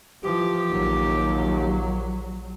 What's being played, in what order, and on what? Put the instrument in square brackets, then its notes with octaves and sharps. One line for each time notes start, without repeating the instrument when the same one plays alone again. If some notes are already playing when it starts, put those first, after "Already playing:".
[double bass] E3 F3 [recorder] G4
[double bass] A#1 F#3 [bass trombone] D#2